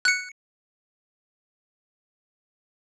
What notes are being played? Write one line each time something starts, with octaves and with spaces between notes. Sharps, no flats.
F#6 C#7